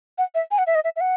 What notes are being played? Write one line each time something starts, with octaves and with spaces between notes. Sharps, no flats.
F#5
E5
G#5
F#5
E5
D#5
E5
E5
F#5